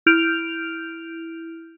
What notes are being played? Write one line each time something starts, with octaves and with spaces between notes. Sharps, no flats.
E4 F6 G6 D7 F7